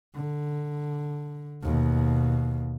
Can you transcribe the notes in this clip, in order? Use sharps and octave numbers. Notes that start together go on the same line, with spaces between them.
D3
D#2 B2